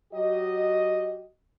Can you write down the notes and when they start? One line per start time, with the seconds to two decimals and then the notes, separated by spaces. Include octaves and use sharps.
0.13 F#3 F#4 G4 D#5